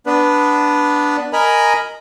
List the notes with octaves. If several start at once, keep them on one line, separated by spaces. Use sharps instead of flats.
B3 D4 B4
A#4 D#5 G#5 A#5 B5